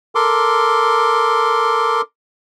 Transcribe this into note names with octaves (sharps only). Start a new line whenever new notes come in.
A4 A#4 C6 D6